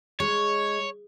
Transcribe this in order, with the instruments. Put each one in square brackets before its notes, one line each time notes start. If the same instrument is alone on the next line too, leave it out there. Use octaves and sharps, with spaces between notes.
[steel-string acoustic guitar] G#3 [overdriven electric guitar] C#5